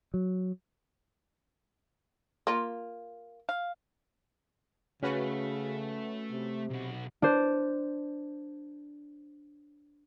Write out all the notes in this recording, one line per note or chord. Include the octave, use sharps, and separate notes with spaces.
F#3
A#3 F4
F5
C#3 A3 C#4 F#4 B4
C3
B1 F#4
D4 C5